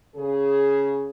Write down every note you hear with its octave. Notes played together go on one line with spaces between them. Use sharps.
C#3 G#4